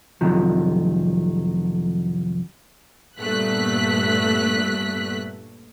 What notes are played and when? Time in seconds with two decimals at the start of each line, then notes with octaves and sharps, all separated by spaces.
0.21 C2 F2 D#3 F3 F#3
3.20 G2 A#2 A3 B3 F#6 B6